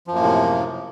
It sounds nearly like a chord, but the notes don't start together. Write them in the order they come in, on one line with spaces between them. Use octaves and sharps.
F3 F#2 A#3 A2 C3